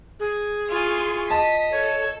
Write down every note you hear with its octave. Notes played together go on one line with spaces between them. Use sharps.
G#4
E4 F4 G#5 C6 C#6
D#5 A5 B6
A4 C#5